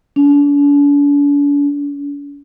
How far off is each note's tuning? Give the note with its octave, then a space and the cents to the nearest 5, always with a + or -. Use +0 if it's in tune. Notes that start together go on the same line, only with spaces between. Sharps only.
D4 -45